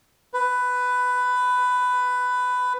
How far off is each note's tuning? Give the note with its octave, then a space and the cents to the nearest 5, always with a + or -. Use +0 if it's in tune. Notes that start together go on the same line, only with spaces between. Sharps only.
B4 +10